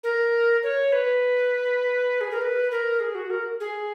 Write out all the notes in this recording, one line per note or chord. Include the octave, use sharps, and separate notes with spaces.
A#4
C#5
B4
G#4
A#4
B4
A#4
G#4
F#4
A#4
G#4